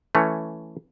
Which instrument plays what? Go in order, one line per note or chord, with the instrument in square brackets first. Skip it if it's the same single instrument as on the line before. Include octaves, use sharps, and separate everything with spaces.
[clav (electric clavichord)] E3 A3 C#4